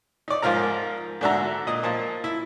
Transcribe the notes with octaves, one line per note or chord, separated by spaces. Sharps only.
D#4 D5
G#2 F3 F4 A#4 A#5
G#2 D3 D4 F#4 E5 A#5
A#2 D#5
F3 A#3 A5
E4